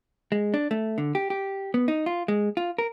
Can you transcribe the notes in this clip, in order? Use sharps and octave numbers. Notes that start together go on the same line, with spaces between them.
G#3
D4
A3
D3
G4
G4
B3
D#4
F4
G#3
F4
A#4